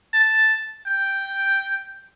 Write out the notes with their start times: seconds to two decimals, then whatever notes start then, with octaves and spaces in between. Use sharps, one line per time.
0.13 A5
0.86 G5